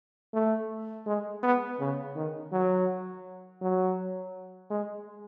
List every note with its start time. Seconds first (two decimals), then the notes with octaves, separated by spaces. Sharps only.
0.34 A3
1.07 G#3
1.43 B3
1.80 C#3
2.16 D#3
2.52 F#3
3.61 F#3
4.70 G#3